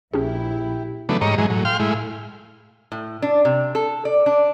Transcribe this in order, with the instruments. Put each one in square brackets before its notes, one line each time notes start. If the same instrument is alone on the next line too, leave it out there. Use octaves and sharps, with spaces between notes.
[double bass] A#1 [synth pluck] C#4 D4 G#4 [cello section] E4 [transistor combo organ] G4
[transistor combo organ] C#3 E3 F#3 A3 B3 D4
G#2 G3 C#5 D#5 A#5
G#2 E3 F#3 G#3
A2 F#3
F5 G5 C6 F6
A2 G#3 E4
[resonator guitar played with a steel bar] A2
D4
C3
A4
D5
D4